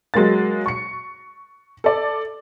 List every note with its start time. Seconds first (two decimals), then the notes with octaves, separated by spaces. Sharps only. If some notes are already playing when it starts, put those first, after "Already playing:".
0.14 F#3 G#3 A#3 A6
0.66 C#6 C#7
1.84 A4 D5